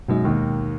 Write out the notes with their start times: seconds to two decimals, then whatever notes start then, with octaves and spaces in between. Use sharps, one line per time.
0.08 F#2 B2 F#3 G#3 D#4
0.25 D#2 D#3